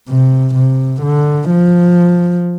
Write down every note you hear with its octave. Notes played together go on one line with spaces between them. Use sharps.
C3
C3
D3
F3